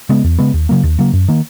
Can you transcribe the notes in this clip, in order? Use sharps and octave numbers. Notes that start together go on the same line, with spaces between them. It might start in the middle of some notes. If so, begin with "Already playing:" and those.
C#3 G#3 B3
E2
C#3 G#3 B3
D#2
C#3 F#3 A#3
D#2
C#3 F#3 A#3
F#2
D#3 A#3